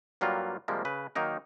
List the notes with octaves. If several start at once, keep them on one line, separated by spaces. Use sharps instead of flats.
G2 F#3 G3 A#3 F4
C3 F3 G3 G#3 A#3
C#3 B4
D#3 F#3 A#3 D#4 A#4